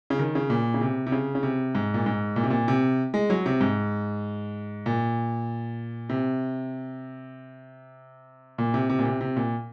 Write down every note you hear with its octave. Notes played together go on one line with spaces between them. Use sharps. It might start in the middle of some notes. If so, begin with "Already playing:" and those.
C#3
D#3
C#3
A#2
C#3
C3
C3
C#3
C#3
C3
G#2
A#2
G#2
A#2
C3
A#2
C3
G#3
F#3
C3
G#2
A#2
C3
A#2
C3
C3
A#2
C3
C3
A#2